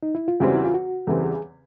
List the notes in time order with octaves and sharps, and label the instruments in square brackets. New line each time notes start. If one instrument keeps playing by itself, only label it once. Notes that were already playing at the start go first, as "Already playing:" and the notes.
[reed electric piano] D#4
E4
F4
[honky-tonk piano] E2 C#3 E3 G3 C4 [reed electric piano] F#4
[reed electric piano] E4
F4
F#4
[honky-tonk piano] E2 C#3 E3 G3 C4 [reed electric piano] A4
[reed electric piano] G#4